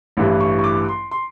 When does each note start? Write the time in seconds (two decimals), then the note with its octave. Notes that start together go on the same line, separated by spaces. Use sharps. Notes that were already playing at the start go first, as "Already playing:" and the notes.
0.17 A1 G2 E3 G3
0.41 C#6
0.59 C#6
0.64 D6
0.89 C6
1.11 C6